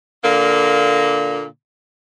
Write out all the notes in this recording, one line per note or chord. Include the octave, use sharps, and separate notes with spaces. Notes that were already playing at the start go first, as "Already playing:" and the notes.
A#2 D3 A#3